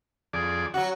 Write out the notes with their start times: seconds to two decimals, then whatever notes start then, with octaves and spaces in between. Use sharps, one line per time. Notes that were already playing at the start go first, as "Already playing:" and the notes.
0.33 F2 G#4 D5
0.74 F#3 F#4 F#5